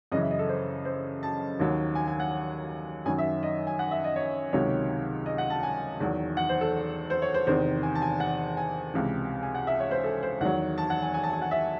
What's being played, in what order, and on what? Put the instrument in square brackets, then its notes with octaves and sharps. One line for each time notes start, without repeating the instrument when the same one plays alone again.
[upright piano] F#2 C#3 E3 D#5
E5
D#5
A4
C5
C5
A5
D#2 D#3 F#3
G#5
G#5
F#5
F#2 D#3 F#3 G#5
E5
D#5
G#5
F#5
E5
D#5
C#5
C#2 C3 D#3 F#3 C#5
D#5
F#5
A5
G#5
E2 D#3 F#3
F#5
C5
A4
C5
C#5
C5
E2 C3 D#3 C5
G#5
A5
G#5
F#5
G#5
C#2 C3 E3
G#5
F#5
E5
C#5
C5
A4
C5
E2 D#3 F#3 F#5
A5
F#5
G#5
G#5
A5
G#5
F#5
E5